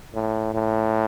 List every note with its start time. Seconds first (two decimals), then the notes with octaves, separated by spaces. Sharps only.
0.14 A2
0.53 A2